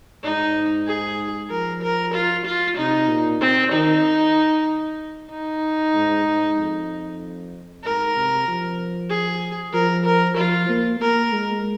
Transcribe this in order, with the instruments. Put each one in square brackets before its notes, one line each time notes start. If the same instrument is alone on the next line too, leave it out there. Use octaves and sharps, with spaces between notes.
[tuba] G#2 [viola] D#4
[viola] G#4
[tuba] F3 [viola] A#4
[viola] A#4
F4
F4
[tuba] C3 [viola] D#4
[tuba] A#2
[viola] C4
[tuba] D#3 [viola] D#4
[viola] D#4
[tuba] G#2
G#2
F2
[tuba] G#2 [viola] A#4
[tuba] C3
F3
[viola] G#4
[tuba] F3 [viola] A#4
[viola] A#4
[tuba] F3 [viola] F4
[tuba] A#3
[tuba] A#3 [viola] A#4
[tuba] G#3